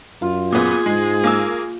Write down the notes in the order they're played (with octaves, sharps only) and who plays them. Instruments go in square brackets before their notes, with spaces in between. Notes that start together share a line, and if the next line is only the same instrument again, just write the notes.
[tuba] F#2 [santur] F4
[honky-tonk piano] A#2 B3 [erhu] G#4
[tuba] G#2 [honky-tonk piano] G#3
[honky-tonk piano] A#3 G#5 E6